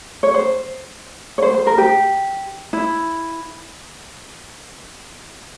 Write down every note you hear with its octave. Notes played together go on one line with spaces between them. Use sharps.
C#5
C5
C#5
C5
C5
A#4
G4
E4